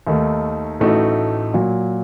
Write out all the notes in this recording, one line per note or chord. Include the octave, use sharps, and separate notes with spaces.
D#2 D#3 A3
A1 A2 A3 D#4 F#4
A#2 F#3